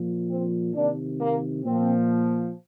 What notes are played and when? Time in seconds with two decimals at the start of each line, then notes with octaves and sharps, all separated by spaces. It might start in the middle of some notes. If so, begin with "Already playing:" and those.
Already playing: A#2 F3
0.30 C4
0.75 C3 D#3 A#3 D4
1.20 A#3
1.65 A#2 F3 C4